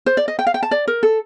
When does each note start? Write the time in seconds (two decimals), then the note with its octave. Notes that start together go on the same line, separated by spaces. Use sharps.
0.06 C5
0.17 D5
0.28 D#5
0.39 G5
0.47 F5
0.54 G5
0.63 A5
0.71 D5
0.88 A#4
1.03 A4